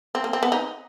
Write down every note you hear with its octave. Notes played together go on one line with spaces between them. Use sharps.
C4
A#3
C4
B3
D#4